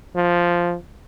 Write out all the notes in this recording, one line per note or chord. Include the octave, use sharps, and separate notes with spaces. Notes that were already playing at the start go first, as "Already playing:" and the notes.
F3